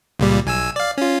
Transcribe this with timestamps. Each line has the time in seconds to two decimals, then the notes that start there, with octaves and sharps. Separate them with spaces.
0.20 C#2 A#2 G3
0.46 B1 G#5 E6
0.76 D5 F5
0.98 C#4 F4